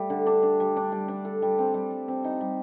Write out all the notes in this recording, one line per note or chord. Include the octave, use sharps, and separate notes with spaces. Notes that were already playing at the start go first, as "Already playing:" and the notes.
Already playing: G3 A3
D3
D4
D4
G3
D4
G3
D4
A4
G3
C4
G3
G3
C4
D#4
G3